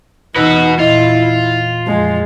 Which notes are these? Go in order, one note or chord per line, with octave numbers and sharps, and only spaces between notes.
E2 E3 D#4 F#4 B4 E6
A#2 E4 F4 D#5
F2 F3 G#3 G#4